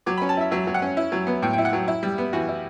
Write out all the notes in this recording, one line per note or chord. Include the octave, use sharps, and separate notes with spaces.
F#3 D6
B5
C#4
A5
E4 E5
F#3 E5
F#3
F#5
C#4
E4
F#3
B3
A2 G5
G5
E4
F#5
F#3
E4
G3
B3
E3 F#4
E4